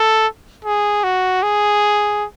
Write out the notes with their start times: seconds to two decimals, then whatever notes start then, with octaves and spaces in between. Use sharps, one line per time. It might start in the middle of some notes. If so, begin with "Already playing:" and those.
Already playing: A4
0.65 G#4
1.04 F#4
1.43 G#4